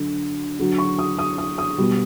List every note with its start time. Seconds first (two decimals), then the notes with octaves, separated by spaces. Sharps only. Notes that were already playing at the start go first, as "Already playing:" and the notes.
Already playing: D3 F#3
0.59 D3 F#3
0.78 C#6
0.99 D#6
1.19 D#6
1.38 D#6
1.58 D#6
1.78 B2 G3